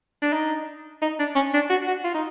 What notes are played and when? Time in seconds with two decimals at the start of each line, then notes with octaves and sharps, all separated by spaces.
0.22 D4
0.33 D#4
1.02 D#4
1.19 D4
1.35 C#4
1.54 D4
1.70 F#4
1.87 F#4
2.04 F4
2.14 D#4